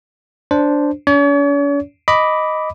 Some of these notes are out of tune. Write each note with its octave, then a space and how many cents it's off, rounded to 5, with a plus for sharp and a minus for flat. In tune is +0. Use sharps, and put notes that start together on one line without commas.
D4 -5 C5 +0
C#4 +45 C#5 +45
D#5 +0 B5 +0 D6 -5